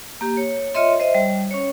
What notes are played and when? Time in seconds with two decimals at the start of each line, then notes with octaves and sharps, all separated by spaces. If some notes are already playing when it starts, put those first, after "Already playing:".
0.21 A#3 G4
0.37 C#5
0.75 F4 C#5 D#5 E5 C6
1.00 C5 D#5 E5
1.14 G3
1.51 C#4 C#5